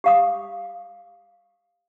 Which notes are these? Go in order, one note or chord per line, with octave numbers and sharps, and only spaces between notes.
G4 F5 D#6